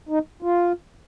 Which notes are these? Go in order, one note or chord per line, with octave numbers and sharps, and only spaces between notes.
D#4
F4